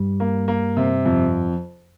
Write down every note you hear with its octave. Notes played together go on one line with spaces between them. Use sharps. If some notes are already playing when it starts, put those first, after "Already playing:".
Already playing: G2 G3
A#3
A#3
C3
F2